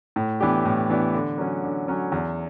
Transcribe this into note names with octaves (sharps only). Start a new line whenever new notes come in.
A2
E3 B3 D4 G4
A2
E3 B3 D4 G4
D3
F#3 C#4
D3
F#3 C#4
E2